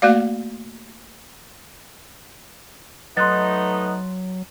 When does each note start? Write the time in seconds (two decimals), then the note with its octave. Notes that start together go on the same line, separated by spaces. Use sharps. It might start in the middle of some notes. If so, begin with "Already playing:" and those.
0.02 A3 A#3 F#4 D5 F5
3.17 F#3 A3 B3 D#4 C6 F#6 A6